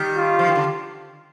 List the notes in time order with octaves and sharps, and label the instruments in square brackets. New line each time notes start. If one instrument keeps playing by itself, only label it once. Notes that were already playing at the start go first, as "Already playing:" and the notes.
Already playing: [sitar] D#3 G3
[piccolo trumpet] F4
[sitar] F3
D#3
D3